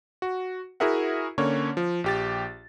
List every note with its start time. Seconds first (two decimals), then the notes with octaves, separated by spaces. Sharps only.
0.22 F#4
0.80 E4 F#4 G#4 A#4 E5 F#5
1.38 D3 A#3 C#4 C#5
1.77 F3
2.04 A#1 G4 A6